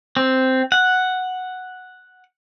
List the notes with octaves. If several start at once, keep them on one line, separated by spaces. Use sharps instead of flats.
C4
F#5